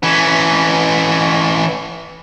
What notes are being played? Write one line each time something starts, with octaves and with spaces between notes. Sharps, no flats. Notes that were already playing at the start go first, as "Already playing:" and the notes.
E3 C#4